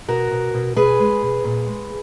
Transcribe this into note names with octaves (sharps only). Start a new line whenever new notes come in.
B2 F#4 A#4
B2
B2
B2 G#4 B4
G#3
B2
A#2
G#3